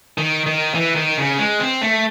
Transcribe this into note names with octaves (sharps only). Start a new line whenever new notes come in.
D#3
D#3
E3
D#3
C#3
G#3
C4
A3